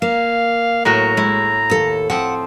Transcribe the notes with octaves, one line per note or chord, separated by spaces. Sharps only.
A#3 F5
A2 F#3 F#4 A#5
G#3 E4
D#2 A4
F3 C4 F#5